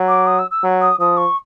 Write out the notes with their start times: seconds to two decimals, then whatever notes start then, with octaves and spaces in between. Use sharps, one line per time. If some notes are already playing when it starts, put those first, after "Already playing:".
Already playing: F#3
0.08 D6
0.27 D#6
0.38 E6
0.51 E6
0.63 F#3
0.81 D#6
0.99 F3 D#6
1.17 C#6